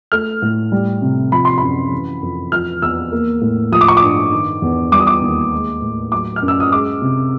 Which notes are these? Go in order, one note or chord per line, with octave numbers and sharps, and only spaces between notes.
A3 F6
A2
G3
C3
F3 B5
C6
F#2 B5
E3
F2
F3 F6
E2 E6
A#3
A2
F3 D#6
D6
C#6
D6
G2
D#3
E2
G3 D6
D#6
D6
D#2
G#3
A2
F#3 D6
F6
F#2
E6
D#6
G#3 D6
C3